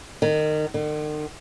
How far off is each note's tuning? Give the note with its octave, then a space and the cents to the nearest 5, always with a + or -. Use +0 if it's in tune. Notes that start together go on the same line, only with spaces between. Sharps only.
D#3 -25
D#3 -45